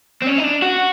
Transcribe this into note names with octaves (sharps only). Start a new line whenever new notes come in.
C4
C#4
D#4
D4
F#4